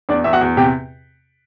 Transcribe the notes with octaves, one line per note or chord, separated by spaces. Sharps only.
E2 D4 D5
E2 E5
F#4 F#5
E2
C3 G4 G5